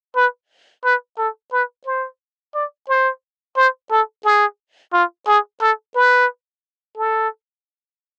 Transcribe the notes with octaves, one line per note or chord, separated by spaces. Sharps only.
B4
B4
A4
B4
C5
D5
C5
C5
A4
G#4
F4
G#4
A4
B4
A4